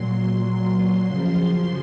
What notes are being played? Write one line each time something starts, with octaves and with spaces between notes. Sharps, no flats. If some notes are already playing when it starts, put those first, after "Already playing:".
Already playing: A#2 F#3 C6
C6
F#2 C#3 F3 C6